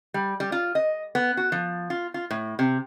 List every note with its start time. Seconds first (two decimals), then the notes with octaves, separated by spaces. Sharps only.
0.14 G3
0.40 G3
0.52 F4
0.75 D#5
1.15 B3
1.37 F#4
1.52 F3
1.90 F4
2.14 F4
2.31 A2
2.59 C3